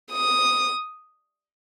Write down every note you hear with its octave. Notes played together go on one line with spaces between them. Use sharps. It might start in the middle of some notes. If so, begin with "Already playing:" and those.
D#6